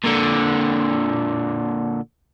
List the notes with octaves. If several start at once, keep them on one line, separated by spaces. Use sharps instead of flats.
A#2 D3